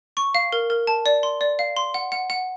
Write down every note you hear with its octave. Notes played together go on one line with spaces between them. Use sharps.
C#6
F5
A#4
A#4
A5
D5
C6
D5
F5
C6
F#5
F#5
F#5